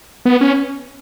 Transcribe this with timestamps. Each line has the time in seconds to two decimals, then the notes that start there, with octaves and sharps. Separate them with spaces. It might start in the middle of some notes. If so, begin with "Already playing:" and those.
0.25 B3
0.41 C#4